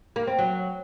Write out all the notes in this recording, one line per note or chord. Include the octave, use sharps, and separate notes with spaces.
A#3
C4
F#3